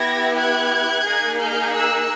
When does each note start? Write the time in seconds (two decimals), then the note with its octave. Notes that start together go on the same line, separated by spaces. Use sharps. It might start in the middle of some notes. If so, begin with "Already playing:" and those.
Already playing: B3 E4 G4 G#6 A#6
0.36 F#6 G#6
1.04 A#3 D#4 G#4
1.38 F6 G6
1.73 E6 F#6